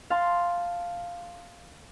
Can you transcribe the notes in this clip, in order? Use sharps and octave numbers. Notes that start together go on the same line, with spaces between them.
F5 A5 C6